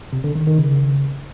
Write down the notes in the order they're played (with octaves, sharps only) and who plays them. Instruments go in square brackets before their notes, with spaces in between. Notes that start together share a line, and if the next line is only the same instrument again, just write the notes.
[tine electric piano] C3
D3
D#3
D#3
C#3